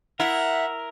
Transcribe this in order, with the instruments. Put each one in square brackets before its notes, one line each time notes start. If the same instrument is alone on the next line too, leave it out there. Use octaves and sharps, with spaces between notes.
[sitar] E4 [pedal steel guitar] A#4 [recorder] E5 [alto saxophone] F#5